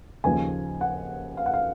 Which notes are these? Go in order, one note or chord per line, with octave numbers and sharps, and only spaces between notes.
D#2 C#3 F3 G#5
F#5
F5
F#5
F5